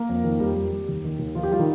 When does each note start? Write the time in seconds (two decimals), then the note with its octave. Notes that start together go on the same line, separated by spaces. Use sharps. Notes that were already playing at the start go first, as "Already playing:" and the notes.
Already playing: A#3 A#4
0.09 F2
0.24 D#3
0.40 F2 G3 G4
0.56 G3
0.72 G3
0.89 D#2
1.05 D#3
1.19 D#2
1.35 D#3 F3 F4
1.43 G4
1.52 G3 F4
1.59 D#3 D#4